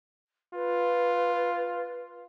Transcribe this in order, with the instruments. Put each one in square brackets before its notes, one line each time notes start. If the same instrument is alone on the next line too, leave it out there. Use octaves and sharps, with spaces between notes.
[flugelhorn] F4 [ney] B4